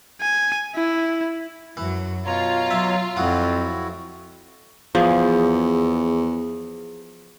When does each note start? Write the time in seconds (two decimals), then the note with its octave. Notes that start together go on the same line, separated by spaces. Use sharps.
0.21 G#5
0.75 E4
1.77 F#2 E3 F#3
2.26 B2 F4 C#5 A#5
2.71 F#3 E5
3.17 F2 F3 F#3 E4 F#4
4.95 E2 F3 G#4